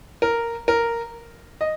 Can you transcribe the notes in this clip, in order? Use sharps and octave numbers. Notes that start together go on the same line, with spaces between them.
A#4
A#4
D#5